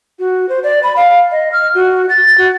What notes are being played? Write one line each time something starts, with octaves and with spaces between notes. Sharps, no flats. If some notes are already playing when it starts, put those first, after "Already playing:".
F#4
C5
D5
B5
F5
D#5
F6
F#4
A6
F#4